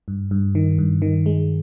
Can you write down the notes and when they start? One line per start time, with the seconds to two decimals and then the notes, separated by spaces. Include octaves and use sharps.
0.08 G2
0.31 G2
0.55 D#3
0.78 G2
1.02 D#3
1.26 G#3